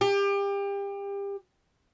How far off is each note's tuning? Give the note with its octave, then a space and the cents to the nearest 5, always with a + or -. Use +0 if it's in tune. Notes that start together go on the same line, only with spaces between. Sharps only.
G4 +30